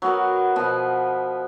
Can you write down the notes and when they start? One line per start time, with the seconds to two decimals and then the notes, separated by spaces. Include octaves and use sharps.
0.02 F#3 B3 F#4 A#4
0.56 B2 F3 B3